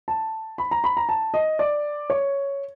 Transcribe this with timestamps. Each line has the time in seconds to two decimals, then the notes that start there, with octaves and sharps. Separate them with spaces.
0.08 A5
0.58 B5
0.71 A#5
0.84 B5
0.97 A#5
1.09 A5
1.34 D#5
1.59 D5
2.10 C#5